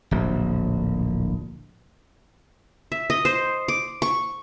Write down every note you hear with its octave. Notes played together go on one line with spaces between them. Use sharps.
D1 A#1
E5
D#5
C5
D6
C#6